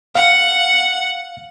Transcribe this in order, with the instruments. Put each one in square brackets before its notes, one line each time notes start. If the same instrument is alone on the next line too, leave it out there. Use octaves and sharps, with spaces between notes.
[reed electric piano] F5 [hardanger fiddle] F#5